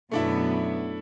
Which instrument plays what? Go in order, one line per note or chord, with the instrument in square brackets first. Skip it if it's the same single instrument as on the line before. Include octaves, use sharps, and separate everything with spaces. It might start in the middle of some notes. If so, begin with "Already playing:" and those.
[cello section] F#2 B2 B3 [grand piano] A3 D4 E4